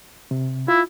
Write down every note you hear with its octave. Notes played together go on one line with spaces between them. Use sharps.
C3
E4 F4